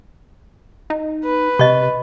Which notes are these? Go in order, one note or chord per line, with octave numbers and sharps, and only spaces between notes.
D#4
B4
C3 D#5 C#6